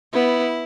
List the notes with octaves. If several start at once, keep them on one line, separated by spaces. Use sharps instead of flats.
B3 E4